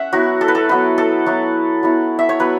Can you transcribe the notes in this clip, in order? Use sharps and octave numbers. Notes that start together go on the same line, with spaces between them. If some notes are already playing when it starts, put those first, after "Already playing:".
Already playing: C#4 E5 F#5
F#3 B3 E4 F#4
A4
B4
A4
F#3 B3 E4 B4
A4
F#3 B3 E4
F#3 B3 E4
E5
C#5
F#3 B3 B4